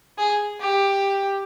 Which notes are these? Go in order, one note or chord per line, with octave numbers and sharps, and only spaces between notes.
G#4
G4